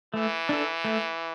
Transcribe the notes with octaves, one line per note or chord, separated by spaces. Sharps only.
E3 A3
D4 A4
A3